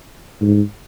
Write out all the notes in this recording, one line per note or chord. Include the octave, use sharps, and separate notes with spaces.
G#2